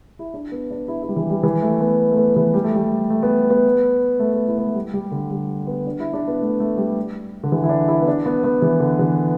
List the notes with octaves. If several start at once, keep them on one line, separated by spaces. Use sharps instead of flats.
E4
D4
B3
D4
E4
E4
G3
E3
G3
E3
A3
B3
A3
B3
E3
G3
A3
G3
A3
B3
B3
A3
B3
E4
B3
A3
G3
G3
D3
G3
B3
D4
E4
D4
B3
A3
A3
G3
D3
E3
E4
D4
E4
B3
D4
B3
B3
E3
D3
E3